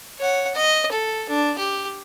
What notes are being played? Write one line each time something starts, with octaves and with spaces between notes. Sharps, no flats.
C#5 F#5
D#5
A4
D4
G4